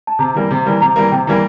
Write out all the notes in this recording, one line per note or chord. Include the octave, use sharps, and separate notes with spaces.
A5
C3 A#5
E3 G3 A#3
C3
E3 G3 A#3
C3 A#5
E3 G3 A#3
C3 G5
E3 G3 A#3